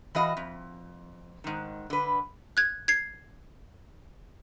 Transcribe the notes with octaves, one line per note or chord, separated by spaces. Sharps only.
E3 F#4 D#5 F5
F2
G#2 D#3
D3 B4
F#6 G#6
G#6 C7